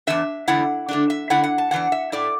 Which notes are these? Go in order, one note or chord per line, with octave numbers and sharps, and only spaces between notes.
E2 E3 D4 E5
E2 D3 A3 E4 F#5
D3 A3 D4
E5
D3 A3 E4 F#5
F#5
A5
E2 E3 D4 F#5
E5
A2 A3 E4 D5